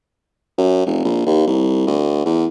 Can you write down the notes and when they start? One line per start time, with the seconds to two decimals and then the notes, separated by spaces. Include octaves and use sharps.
0.58 F#2
0.86 F1
1.05 A#1
1.26 D#2
1.47 C2
1.87 D2
2.26 E2